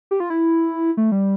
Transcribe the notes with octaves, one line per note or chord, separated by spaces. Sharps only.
G4
F4
E4
A3
G3